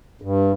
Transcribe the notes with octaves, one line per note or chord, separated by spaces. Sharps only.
G2